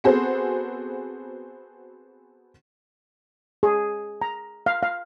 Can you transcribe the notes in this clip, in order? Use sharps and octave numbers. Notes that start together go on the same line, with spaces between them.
B3 C4 F#4 G#4 A4 C5
G#4
A#5
F5
F5